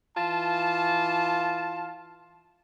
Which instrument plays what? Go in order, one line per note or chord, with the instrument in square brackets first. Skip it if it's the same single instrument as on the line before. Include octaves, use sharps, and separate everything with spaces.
[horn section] E3 F4 A5